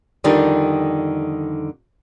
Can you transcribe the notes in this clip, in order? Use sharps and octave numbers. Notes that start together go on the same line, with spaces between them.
F2 D3 D#3 G3 D4 D#4